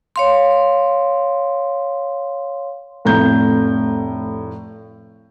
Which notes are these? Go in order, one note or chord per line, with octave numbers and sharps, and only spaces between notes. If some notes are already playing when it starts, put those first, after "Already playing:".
C#5 F5 C6
F1 A2 A#5 G6